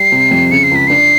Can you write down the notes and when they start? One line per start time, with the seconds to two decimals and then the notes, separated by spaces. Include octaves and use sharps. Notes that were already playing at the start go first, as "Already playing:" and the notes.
Already playing: G3 C7
0.12 C3
0.31 F2
0.51 C#3 C#7
0.63 C7
0.71 C#2 B6
0.87 D4 C7